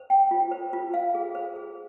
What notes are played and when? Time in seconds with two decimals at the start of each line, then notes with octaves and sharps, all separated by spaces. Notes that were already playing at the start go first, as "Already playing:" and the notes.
Already playing: C5
0.10 G5
0.31 F4
0.51 C5
0.73 F4
0.94 F5
1.15 G#4
1.35 C5
1.56 G#4